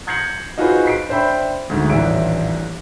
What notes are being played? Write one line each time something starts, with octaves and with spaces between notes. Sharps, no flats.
G6 G#6 A#6 C7 C#7 F#7
D#4 F4 F#4 G#4 B4 C5
B6 C7 D7
D4 C5 E5 G5 B5
D2 G#2
D#1 A1 E3 D4 E5 D7